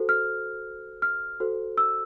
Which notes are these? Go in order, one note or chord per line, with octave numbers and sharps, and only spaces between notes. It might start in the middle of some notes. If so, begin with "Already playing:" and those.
Already playing: F#4 A4 C5
F6
F6
F#4 A4 C5
E6